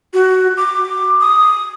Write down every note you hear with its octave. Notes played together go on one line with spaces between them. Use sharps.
F#4
D6
D#6